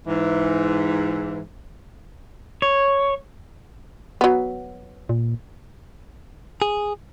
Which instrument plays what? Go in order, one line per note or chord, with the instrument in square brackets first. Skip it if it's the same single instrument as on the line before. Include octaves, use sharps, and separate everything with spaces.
[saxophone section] G#2 E3
[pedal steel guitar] C#5
[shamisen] F#3 B3
[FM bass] A#2
[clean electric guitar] G#4